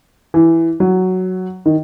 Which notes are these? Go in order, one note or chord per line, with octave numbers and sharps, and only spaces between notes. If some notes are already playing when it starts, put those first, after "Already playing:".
E3
F#3
D#3